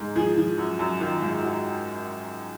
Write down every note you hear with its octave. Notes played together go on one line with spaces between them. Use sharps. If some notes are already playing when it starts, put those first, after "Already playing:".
Already playing: G#2
F3 G#4
F3
F#2
F#2
D#3 F4
G#2
F#3